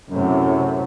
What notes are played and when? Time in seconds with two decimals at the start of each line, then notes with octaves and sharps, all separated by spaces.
0.10 F#2 A2 C3